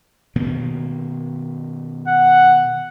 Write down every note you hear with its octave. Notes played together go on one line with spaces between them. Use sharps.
B2 D#3 A#3
F#5